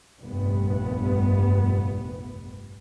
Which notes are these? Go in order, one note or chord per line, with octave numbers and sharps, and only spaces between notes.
F1 A#1 G2 B3